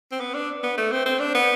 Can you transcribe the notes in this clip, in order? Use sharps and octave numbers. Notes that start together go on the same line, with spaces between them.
C4
B3
D4
B3
A3
C4
C4
D4
B3